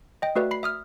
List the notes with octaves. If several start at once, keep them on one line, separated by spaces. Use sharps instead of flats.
D#5 G5
A3 F#4 B4 D5 E5
B5 C7
E5 D#6 F6